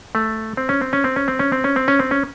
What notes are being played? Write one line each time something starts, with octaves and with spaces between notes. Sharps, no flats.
A3
C4
C#4
C4
C#4
C4
C#4
C4
C#4
C4
C#4
C4
C#4
C4
C#4